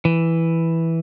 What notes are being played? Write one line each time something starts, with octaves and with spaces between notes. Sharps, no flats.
E3